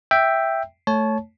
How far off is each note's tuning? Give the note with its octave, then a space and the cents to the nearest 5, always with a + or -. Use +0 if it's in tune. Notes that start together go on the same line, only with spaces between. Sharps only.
E5 +0 G5 +0
A3 +0 C#5 +0 A5 -25